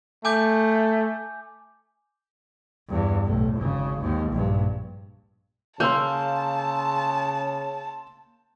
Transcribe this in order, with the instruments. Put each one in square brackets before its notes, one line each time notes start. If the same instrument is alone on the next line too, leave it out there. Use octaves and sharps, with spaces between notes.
[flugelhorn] A3 [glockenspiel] G#5 D6 G6
[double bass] E2 G2
B1 A2
G#1 C#3
D#2 G#2
A#1 G2
[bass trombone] C#3 [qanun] A#3 [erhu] A5 [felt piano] C6 E6 G6